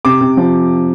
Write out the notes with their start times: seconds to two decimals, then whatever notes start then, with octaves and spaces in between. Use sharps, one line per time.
0.05 C3 D6
0.21 C3
0.37 F3